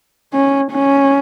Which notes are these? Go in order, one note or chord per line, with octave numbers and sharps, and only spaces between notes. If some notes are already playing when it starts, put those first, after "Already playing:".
C#4
C#4